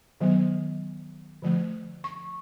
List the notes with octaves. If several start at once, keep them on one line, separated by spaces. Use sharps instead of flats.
D#3 F#3 B3
D3 F3 A3
C#6